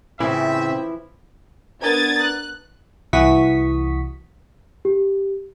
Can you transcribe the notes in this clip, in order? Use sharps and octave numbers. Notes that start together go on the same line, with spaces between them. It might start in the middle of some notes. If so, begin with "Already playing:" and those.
A2 C#3 E3 F3 C4 E4 E5
B3 D4 A#4 D#6 G#6 A6
F#6
C2 E3 F#4 C#6 D#6 B6
G4